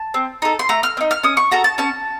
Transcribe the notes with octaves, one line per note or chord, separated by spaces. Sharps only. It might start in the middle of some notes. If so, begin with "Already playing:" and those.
Already playing: A5
C4
D#4 A4
C6
A3 A#5
F6
C4
D#4
F6
C#4 D#6
C#6
F#4 A4 A#5
A5
C#4 A5